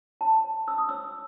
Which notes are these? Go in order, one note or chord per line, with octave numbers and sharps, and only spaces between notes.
C#5 A5
C#5
C#5 E6
D#6
C#5 E6